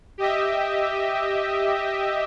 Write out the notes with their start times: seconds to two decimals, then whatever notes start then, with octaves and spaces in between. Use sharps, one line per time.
0.18 G4 D#5 E5